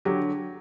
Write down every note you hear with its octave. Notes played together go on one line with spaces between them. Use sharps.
D3 F#3 G4